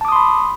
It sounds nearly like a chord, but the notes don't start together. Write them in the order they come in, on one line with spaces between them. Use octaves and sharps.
A5 D6 D#6 C6 B5